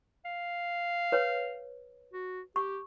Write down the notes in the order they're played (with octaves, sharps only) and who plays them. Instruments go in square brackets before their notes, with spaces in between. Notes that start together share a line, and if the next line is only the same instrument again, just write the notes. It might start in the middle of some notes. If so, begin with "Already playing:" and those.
[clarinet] F5
[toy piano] B4 C#5
[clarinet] F#4
[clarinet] G4 [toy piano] C#6